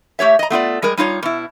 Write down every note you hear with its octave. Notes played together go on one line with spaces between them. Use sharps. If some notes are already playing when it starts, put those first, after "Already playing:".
A3 G4 C#5 E5
D#5 A#5
A3 B3 F4 D5
G3 G#3 A#4
G3 D#4 F4 C#5
B2 E4